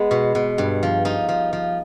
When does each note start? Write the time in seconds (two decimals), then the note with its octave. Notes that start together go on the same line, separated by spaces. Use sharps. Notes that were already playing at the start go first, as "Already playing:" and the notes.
Already playing: G#3 B3
0.11 B2
0.35 B2
0.58 G2
0.83 F3
1.05 F3 D#4
1.29 F3
1.53 F3